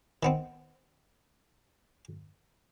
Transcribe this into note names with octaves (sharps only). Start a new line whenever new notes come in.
D#3 B3 C4